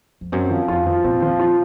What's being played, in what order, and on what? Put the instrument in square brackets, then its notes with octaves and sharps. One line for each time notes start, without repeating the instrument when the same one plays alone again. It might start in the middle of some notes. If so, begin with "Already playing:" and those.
[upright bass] F2
[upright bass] F#2 [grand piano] C4
[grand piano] F3
[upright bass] F2 [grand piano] F4
[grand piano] F3
[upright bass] A#2 [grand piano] C4
[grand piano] F3
F4